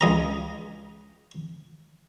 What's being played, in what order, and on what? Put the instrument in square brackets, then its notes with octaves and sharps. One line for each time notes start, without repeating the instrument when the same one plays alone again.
[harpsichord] C#2 D#5 A#5